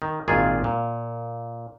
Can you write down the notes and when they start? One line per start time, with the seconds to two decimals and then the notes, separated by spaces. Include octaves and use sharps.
0.02 D#3
0.28 G#1 A#2 D#3 F4 G#4 D5
0.64 A#2